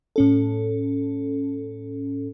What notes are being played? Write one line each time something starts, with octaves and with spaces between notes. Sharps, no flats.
A2 C#4 A4